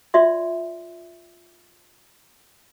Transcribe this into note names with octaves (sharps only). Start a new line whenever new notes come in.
F4 D5 E5 C6